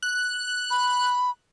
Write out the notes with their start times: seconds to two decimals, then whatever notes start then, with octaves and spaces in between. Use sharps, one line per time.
0.02 F#6
0.71 B5